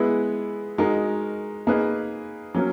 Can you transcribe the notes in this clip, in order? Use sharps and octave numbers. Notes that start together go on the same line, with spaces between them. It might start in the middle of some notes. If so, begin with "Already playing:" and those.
Already playing: G#3 B3 E4 G#4 B4
G#3 D#4 F#4 A#4
A#3 D#4 G#4 B4
F#3 A#3 C#4